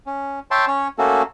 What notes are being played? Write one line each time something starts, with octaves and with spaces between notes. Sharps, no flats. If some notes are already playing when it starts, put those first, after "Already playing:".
C#4
C#5 E5 G5 A5 C6
C#4 C#5
A3 A#3 C#4 F#4 A4